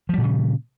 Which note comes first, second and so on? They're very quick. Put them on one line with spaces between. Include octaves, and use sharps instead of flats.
F3 G3 A#2 C#3